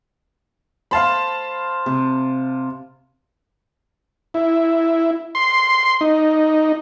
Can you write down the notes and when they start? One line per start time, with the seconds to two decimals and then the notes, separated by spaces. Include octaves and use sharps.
0.91 C5 F5 A5 B5
1.86 C3
4.34 E4
5.35 C6
6.01 D#4